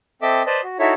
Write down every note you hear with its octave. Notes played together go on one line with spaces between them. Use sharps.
C4 A4 D#5 E5 D6
B4 C5 D5 D#5 A5
F#4
D#4 E4 F#4 A4 C#5 E5